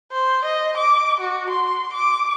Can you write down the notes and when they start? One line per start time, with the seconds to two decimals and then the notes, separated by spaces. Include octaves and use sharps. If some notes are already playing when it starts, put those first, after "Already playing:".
0.12 C5
0.45 D#5
0.77 D6
1.20 F#4
1.50 C6
1.93 D6